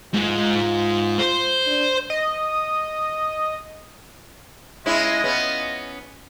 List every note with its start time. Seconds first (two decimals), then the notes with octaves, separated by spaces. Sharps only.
0.14 G#2 F4
1.19 C5
1.67 D4
2.10 D#5
4.86 G#3 C#4 E4 F4 D#5
5.24 B3 C#4